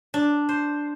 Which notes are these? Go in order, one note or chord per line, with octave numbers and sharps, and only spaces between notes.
D4
C5